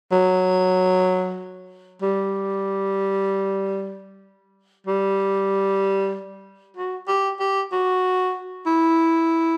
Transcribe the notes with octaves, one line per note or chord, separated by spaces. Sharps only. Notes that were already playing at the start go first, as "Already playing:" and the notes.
F#3
G3
G3
F#4
G4
G4
F#4
E4